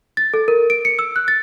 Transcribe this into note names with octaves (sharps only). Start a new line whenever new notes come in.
A6
A4
A#4
D7
C#7
E6
F#6
A6